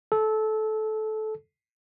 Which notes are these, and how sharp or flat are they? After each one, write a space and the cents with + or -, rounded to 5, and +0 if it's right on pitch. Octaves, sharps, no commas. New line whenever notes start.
A4 -20